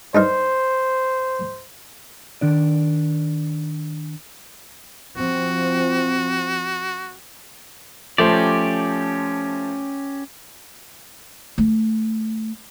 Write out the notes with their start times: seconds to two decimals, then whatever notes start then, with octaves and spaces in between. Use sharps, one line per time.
0.15 G2 D#4 A#4 C5
2.41 D#3 D4 D5
5.16 F3 C4 F#4
8.18 F3 A3 C#4 G4 C5 D5
11.58 A3